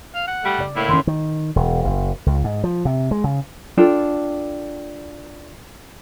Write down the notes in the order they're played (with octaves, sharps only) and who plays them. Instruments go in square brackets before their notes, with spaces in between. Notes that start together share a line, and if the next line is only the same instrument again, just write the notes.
[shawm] F5
F#5
[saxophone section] G3 A3
[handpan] C#3 D5
[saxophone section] A2 A#3 [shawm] E4
[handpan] D#3 E3 C#4 [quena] C6
[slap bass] D#3
E1
F#1
C#2
G#2
F3
C3
G#3
C#3
[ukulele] D4 F4 A4 G5